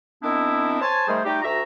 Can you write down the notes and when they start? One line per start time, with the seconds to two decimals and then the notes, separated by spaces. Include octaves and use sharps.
0.23 D#3 B3 C4 D4 E4
0.82 C5 C#5 G#5 A5
1.07 D#3 G3 A3 G#4 C5
1.24 G3 A3 D#4 G4
1.42 D2 F#4 E5 A#5